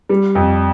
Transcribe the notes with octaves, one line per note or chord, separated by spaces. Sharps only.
G3
F2